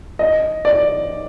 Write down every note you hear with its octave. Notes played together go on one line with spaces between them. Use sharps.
D#5
D5